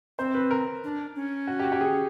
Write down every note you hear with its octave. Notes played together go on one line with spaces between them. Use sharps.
C4 C5
B4
A#4
D4
C#4
F#4
G4
F#4
G4
G#4